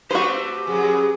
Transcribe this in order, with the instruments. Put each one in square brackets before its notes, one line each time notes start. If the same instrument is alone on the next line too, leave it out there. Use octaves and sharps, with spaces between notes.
[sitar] A3 C4 B4 [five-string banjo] F#4 C5 [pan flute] G4
[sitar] F2 F#3 [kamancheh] G#4